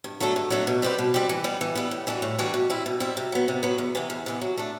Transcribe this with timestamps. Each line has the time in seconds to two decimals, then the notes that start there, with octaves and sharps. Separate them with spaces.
0.04 G2
0.20 F#3 A3 D4 A4
0.36 G2
0.50 F#3 A3 D4 A4
0.67 B2
0.82 G3 C4 G4 B4
0.98 B2
1.14 G3 C4 G4 B4
1.29 E3
1.44 G3 B3
1.61 E3
1.75 G3 B3
1.91 A2
2.07 E3 G3 D4 F#4
2.22 A2
2.38 E3 G3 D4 F#4
2.54 B2
2.70 G3 C4 E4
2.86 B2
3.00 G3 C4 E4
3.17 C3
3.32 F#3 B3
3.48 C3
3.63 F#3 B3
3.78 E2
3.95 C3 E3 B3
4.10 E2
4.26 C3 E3 B3
4.41 F#3
4.57 A3 D4